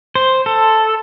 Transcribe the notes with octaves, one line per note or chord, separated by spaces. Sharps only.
C5
A4